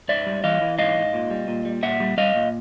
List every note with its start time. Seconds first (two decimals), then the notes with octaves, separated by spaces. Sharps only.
0.08 G#2 D5 E5
0.26 G3
0.44 E3 D#5 F5
0.61 E3
0.79 G#2 D#5 F5
0.96 G#2
1.13 A#2
1.30 G3
1.48 A#2
1.65 G3
1.83 A#2 E5 F#5
2.00 G3
2.17 G3 D#5 F5
2.35 A#2